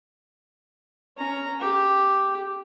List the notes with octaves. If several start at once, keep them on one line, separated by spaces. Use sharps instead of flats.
C#4 A#5
G4